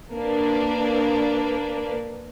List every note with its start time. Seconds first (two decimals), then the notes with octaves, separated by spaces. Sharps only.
0.13 A#3 D4 B4